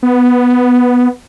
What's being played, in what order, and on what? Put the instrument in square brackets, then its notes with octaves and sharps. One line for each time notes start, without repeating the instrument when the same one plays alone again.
[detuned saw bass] B3